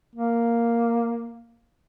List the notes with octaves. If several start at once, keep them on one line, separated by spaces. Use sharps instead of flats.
A#3